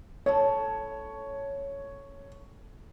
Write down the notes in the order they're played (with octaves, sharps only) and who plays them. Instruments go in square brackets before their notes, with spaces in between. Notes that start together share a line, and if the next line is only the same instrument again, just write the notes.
[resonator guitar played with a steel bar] F#2 A2 A4 [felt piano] C#5